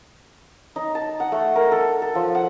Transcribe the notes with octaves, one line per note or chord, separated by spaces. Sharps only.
D#4
A5
F#5
A3
A#4
A4
A4
F3
F#5